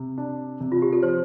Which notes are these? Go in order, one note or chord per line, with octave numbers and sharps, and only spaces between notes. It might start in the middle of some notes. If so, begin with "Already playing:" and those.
Already playing: C3
D4
C3
F4
G4
A4
F3 C5